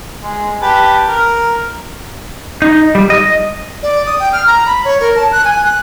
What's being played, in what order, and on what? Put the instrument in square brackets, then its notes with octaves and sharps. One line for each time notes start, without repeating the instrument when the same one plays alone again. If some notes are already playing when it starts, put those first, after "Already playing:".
[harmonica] G#3
G4 B4 A5
A#4
[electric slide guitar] D#4
G3
D#5
[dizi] D5
D#6
G5
F6
A#5
B5
C#5
A#4
A5
F#6
G#5
F#6